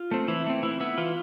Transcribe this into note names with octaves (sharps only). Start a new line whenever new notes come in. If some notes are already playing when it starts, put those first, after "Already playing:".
Already playing: F4
A3 C4
E3 E4
A3 C4
E3 E4
B3 E4
E3 F4